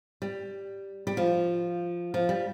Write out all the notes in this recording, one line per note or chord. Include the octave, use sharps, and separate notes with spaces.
G3
G3
F3
F3
G3